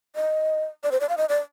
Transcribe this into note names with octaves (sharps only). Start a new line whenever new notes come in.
D#5
D5
C5
D5
F5
D#5
D5